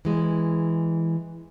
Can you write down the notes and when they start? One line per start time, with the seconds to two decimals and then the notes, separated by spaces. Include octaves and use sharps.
0.05 E3 G#3